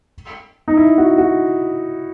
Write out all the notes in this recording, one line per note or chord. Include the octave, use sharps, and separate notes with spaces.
D#4
E4
F#4
F#4